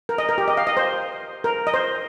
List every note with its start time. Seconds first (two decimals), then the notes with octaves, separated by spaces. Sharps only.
0.09 A#4
0.18 D#5
0.29 A#4
0.38 G4
0.48 D#5
0.57 F5
0.67 D#5
0.77 C5
1.44 A#4
1.67 D#5
1.74 C5